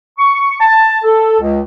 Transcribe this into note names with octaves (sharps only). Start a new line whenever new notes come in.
C#6
A5
A4
C#2